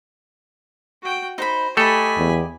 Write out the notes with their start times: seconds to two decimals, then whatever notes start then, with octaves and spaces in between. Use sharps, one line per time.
1.02 F#4 G5
1.38 D#4 C5 F#5 B5
1.77 A3 G4 A4 D#5 G#5 B5
2.18 E2